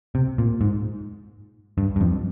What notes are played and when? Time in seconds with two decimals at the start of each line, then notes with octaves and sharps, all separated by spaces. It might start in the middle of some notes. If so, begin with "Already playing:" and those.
0.15 C3
0.38 A#2
0.61 G#2
1.78 G2
1.96 G2
2.01 F2